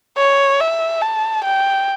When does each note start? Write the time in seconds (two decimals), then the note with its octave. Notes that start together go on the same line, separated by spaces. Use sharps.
0.18 C#5
0.61 E5
1.02 A5
1.44 G5